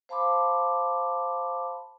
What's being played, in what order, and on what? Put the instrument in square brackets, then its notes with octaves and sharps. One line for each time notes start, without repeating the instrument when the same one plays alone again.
[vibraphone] C5 F5 A5 B5 C6 D6